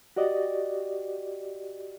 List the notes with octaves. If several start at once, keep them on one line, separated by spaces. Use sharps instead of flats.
F#4 G4 D5 D#5